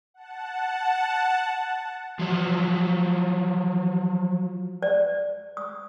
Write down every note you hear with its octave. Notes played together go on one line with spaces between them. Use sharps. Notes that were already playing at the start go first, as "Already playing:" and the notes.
F#5 A5
F3 F#3
D5
D#6